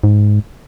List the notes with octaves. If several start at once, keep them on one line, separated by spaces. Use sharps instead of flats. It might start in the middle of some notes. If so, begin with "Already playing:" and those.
G#2